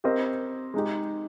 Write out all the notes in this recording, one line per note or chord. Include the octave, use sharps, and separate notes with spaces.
C4 G4 A#4 D#5
G#3 D#4 G4